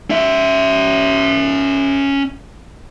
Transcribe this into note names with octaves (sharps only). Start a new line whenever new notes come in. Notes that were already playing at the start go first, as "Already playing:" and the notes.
C#4 E5